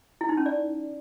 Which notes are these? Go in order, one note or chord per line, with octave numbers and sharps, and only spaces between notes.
E4
D#4
C#4
D5